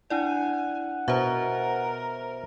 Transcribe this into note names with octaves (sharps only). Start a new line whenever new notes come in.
D4 E4 D5 F#5 G#5
B2 A#4 C5 E5